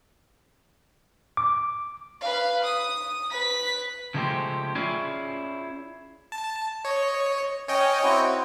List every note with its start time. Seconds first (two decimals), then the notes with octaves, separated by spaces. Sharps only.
1.37 D6
2.21 B4 F5
2.64 D#6
3.31 B4 B6
4.14 C#3 F3 G#3 A3 G4 C5
4.75 C#4 E4 F4 G#4 D5
6.32 A5
6.85 C#5 D#5
7.68 C#4 C#5 D#5 G5 G#5
8.03 C4 E4 F#4